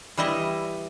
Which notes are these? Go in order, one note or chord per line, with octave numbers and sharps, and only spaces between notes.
E3 G3 E4 D#5